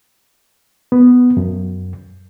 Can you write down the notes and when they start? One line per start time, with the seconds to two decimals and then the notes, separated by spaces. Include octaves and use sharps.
0.92 B3
1.37 F#2